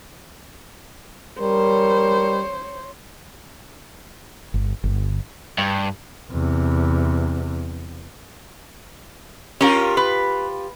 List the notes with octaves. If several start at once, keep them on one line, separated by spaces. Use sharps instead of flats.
G3 A#4 C5 C#5
G1
G1
G2
E2 C3
C#4 F4 G4 A#4
B4